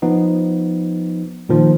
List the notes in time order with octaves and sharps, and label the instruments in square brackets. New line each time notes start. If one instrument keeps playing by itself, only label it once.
[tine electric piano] F3 B3 D#4
A#2 D#3 F3